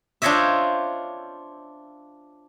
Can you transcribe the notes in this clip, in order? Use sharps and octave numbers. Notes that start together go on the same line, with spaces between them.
D4 F4 C5 C#5 D#5 E5